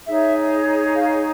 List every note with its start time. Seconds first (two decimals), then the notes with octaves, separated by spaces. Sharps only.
0.07 D#4 G#4 C#5 E5
0.95 F5